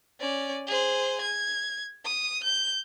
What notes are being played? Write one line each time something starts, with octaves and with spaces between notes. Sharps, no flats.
C#4 D5
G#4 C5
G#6
D#6
G6